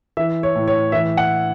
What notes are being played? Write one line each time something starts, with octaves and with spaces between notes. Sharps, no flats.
E3 E5
C#5
A2
C#5
E3 E5
F#5